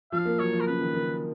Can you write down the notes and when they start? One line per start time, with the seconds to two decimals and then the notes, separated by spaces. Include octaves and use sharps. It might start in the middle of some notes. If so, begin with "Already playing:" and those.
0.12 F3 F5
0.25 A#3
0.39 F#3 C#5
0.53 F3
0.60 A#4
0.67 C#3 B4
0.81 D#3
0.94 D#3